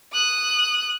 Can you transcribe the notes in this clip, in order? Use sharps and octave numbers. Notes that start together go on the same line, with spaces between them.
D#6 F#6